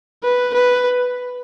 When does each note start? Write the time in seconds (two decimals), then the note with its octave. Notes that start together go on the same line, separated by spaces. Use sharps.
0.23 B4
0.54 B4